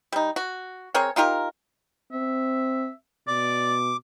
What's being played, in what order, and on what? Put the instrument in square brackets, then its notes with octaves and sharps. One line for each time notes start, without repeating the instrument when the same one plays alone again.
[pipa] G3 D#4
F#4
C4 G#4 A#4 C#5
D#4 F4 G4 A#4
[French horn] C4 [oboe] E5
[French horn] B2 [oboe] D5 [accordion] D6